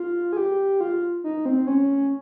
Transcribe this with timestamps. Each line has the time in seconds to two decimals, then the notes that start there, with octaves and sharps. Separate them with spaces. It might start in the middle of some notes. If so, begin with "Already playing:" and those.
Already playing: F4
0.33 G#4
0.37 G4
0.81 F4
1.24 D#4
1.46 C4
1.67 C#4